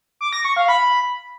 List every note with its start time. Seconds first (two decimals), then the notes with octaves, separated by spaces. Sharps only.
0.21 D6
0.33 A#6
0.44 C#6
0.56 F5
0.68 B5